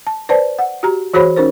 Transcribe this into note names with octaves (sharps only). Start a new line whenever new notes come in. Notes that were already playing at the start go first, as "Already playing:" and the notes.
A5
B4 C5 D5 A5
F#5
F#4 G4 A#5
E3 F#4 G#4 C5 C#5 B5
C#4 D#4 A#4 C5